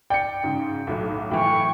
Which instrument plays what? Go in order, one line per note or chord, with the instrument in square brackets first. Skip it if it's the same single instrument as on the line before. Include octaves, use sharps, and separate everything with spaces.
[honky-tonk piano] D5 [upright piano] G5 C#7
[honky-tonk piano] G#2 C#3
B1 A2 F#3
[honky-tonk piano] A2 E3 [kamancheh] G5 C#6